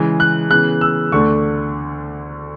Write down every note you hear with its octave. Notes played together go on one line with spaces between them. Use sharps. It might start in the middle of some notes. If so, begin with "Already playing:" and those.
Already playing: C#3 E3 G#3
F#6
C#3 E3 B3 F#6
E6
D2 D3 A3 D4 C#6